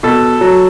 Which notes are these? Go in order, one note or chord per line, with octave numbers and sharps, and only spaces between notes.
B2 A4
F#3